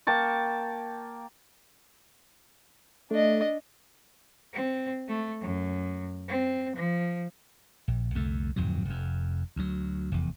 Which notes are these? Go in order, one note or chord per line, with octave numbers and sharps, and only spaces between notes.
A#3 G5 A5 C#6
A3 D4 D#5
C4
A3
F#2
C4
F3
A#1
C2 F2 D3 A3
D1 F2 G#2 F#3
F1 F2
D2 F#3
F1 E2